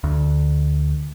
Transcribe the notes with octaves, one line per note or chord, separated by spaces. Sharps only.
D2